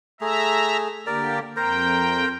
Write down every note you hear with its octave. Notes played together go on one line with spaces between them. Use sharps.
A3 G#4 E5 A#5
D3 A#3 G4 A#4 D5
F2 A#4 C5 G5 A#5